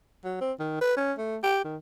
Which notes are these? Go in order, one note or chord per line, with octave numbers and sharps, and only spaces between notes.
F#3
C4
D#3
B4
C#4
A3
G4
D#3